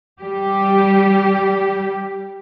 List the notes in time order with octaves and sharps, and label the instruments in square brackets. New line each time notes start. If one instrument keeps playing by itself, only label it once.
[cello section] G3 G4